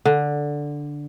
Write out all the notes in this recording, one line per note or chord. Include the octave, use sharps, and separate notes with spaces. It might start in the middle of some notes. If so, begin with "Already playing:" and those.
D3